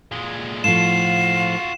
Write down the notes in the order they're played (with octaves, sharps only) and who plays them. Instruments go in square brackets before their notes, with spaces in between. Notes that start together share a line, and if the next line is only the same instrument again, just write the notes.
[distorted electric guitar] A#2 G#3
[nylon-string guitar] A2 F3 [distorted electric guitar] F4 F#4 [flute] F5 [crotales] E7